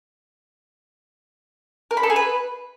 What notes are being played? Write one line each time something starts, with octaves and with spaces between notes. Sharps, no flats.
A#4
B5
A4
G#4
B4